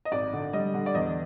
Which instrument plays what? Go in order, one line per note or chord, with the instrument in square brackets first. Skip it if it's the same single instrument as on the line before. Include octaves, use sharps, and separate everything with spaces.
[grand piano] D#5
G#1 D5
D3
G3 D#5
D3
D5
E2 D#5